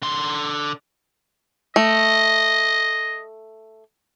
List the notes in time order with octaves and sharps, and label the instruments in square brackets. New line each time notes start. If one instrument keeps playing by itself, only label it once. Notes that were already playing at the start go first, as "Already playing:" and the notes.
[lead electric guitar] D3 C6
[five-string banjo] A3 [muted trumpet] D#5